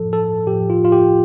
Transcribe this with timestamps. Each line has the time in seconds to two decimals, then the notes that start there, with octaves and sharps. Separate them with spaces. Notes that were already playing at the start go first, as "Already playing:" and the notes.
Already playing: A2 F3 A4
0.13 A4
0.47 A2 F3 G4
0.70 F4
0.85 F4
0.92 G4